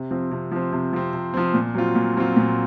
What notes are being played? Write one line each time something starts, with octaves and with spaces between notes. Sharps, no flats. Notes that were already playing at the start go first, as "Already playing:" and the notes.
Already playing: C3
F3 C4
C3
F3 C4
C3
F3 C4
C3
F3 C4
A#2
F#3 C4 F4
A#2
F#3 C4 F4
A#2